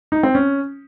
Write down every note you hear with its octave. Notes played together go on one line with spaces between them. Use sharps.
D#4
C4
C#4